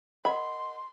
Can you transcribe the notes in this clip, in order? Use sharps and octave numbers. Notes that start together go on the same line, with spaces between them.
A#4 D#5 F#5 B5 C6